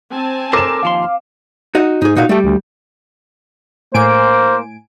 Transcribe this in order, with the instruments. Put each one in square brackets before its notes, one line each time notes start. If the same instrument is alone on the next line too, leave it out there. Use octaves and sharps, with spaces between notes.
[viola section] C4 G#5 A5
[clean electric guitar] A4 A#4 C5 [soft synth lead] A#5 [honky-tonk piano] D6 E7
[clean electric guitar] D#2 F3 C6 [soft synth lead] F5
[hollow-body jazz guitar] D#4 F#4 D#5
[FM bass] G#2 [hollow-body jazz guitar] D#4 G#4
[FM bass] A#2 [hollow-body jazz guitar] D#4 F#4 F5
[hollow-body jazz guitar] G3 G4 [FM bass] A3
[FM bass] D2
[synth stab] A2 G#5 D7 [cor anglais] A#3 [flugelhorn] C5